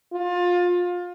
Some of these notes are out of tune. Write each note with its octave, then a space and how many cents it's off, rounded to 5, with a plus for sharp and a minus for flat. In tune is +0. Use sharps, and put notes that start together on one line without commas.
F4 +25